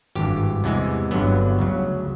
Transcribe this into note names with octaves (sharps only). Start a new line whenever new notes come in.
G#1 G2 E3 G4
E2 C3 E3 G#3
G1 G2 D3 F#3 B3
D2 C#3 F#3